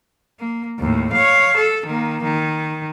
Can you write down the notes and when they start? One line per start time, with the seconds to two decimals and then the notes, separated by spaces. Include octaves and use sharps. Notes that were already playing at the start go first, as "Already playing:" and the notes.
0.40 A#3
0.80 D#2 A2
1.13 C#5 F5
1.57 A4
1.86 D#3 A#3
2.23 D#3